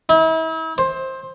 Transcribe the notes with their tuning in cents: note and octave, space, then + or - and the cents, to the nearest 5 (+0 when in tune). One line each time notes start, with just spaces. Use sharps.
E4 -40
C5 +15